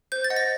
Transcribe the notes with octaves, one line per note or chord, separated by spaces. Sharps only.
C5 G6
A6
D#5 F#5
A#6